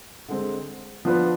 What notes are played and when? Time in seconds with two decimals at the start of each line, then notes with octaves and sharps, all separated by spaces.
0.29 D3 G#3 C4
1.05 F3 B3 D4 F4 B4